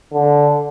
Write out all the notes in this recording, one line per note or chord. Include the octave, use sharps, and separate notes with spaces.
D3